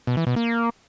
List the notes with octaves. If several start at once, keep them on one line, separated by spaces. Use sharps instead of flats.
B2
E3
B2
A#3